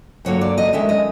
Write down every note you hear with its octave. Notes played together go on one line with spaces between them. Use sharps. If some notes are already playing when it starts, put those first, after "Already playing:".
G2 D3 F#3 A#3 C#5
D5
D#5
F#2 D#3 G#3 E5
D#5